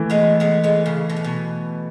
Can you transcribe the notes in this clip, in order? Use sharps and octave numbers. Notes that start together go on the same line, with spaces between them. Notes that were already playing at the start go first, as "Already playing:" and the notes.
Already playing: E3 A3
G#3 B3
G#3 B3
G#3 B3
C#3
B2
A2
B2